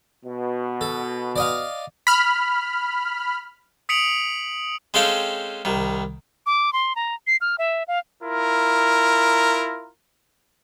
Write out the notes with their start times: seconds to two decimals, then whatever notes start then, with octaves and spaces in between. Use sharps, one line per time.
0.25 B2
0.81 A4
1.36 D5 D#5 F5
2.07 B5 F6
3.89 D#6 B6 C#7 D7 F7 F#7
4.94 G#3 C4 C#4 A4 F5 G5
5.65 C2 D#3
6.46 D6
6.73 C6
6.96 A#5
7.27 C7
7.41 F6
7.58 E5
7.88 F5
8.23 E4 F4 A#4